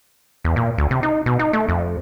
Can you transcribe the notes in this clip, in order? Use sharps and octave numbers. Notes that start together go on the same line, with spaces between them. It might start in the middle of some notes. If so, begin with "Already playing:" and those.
E2
A#2
D2
C3
D#4
B2
D#4
A3
F2